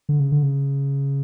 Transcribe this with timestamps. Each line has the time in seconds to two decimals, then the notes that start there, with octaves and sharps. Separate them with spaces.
0.09 D3
0.20 C#3
0.32 D3
0.43 C#3